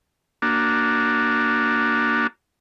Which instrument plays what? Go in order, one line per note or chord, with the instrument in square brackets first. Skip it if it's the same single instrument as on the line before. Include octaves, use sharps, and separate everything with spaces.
[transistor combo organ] A#3 D4 F#4